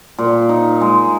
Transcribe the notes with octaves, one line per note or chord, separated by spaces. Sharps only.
A#2
D#4
G#3